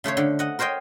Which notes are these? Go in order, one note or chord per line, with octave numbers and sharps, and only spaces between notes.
C#3 A3 C5 C#5
D3
D#5 F#5
A#4 C5 C#5 D#5 G5